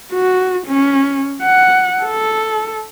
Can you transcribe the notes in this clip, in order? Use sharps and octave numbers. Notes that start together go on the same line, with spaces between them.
F#4
C#4
F#5
A4